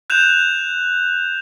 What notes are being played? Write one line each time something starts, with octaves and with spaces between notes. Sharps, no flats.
F#6 G6 E7 F7